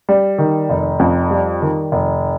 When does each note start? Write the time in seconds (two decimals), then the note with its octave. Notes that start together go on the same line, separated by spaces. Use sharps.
0.09 G3
0.38 D#3
0.70 F1
0.99 F2
1.31 G3
1.62 D#3
1.92 F1